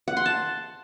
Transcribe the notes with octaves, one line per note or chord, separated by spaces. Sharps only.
F#5
C6
A5